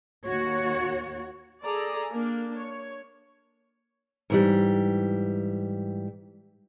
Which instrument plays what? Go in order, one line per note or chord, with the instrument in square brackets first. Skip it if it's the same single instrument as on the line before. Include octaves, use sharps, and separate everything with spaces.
[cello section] D#2 F#4 C#5
[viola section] G#4 A4 D5 A#5
A#3 D4
C#5
[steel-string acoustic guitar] G#2 E3 G3